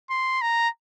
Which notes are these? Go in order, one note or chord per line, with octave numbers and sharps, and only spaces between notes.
C6
A#5